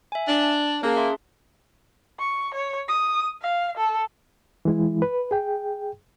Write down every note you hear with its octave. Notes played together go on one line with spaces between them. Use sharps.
E5 G#5
D4
A5
A#3 C#4 G#4 A5
G#4 E5 C6
C#6
C#5
D#6
F5
A4
E3 G#3 E4
B4
G#4 G5